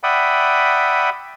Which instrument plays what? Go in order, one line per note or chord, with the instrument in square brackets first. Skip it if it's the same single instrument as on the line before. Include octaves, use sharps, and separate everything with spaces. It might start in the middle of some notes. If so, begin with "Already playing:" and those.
[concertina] D5 E5 F#5 G5 B5 D#6